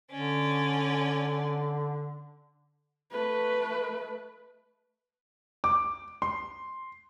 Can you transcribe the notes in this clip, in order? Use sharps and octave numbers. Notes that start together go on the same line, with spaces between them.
D3 C#4 D5
A3 B4
D6
C6